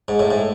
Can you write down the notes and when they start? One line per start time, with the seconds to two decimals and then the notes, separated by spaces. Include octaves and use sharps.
0.08 G#2
0.19 A2
0.31 A2